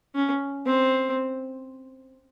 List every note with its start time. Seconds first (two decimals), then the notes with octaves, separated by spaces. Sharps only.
0.15 C#4
0.66 C4